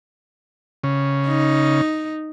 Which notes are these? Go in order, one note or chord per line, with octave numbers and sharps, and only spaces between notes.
C#3
D#4